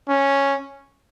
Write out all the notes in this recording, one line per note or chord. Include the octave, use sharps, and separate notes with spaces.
C#4